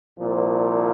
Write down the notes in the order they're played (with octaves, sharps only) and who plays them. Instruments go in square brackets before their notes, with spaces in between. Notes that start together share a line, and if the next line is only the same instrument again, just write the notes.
[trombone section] C2 A#2 F3